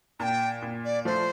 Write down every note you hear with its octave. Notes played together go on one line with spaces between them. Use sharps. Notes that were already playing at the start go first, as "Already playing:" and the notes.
A#2 G5 A#5
A#2
D5
F3 A3 C5